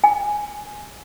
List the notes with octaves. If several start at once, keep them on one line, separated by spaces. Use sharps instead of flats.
G#5